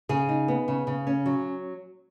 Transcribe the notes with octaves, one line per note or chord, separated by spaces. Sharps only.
C#3 G#4
D#4
B3
C#3
C#3
C#4
F#3